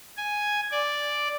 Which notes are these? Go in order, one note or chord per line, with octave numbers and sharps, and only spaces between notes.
G#5
D5